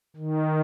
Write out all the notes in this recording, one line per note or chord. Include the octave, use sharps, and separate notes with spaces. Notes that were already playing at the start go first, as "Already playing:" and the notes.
D#3